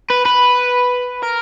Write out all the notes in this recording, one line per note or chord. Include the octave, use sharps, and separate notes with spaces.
B4
B4
A#4